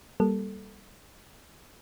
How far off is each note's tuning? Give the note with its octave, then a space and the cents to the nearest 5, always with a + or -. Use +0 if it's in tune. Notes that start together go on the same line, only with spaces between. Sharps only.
G3 +0 A#3 +15 A4 +0